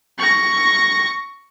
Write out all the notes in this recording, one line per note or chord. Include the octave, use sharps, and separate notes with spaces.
C#6 A#6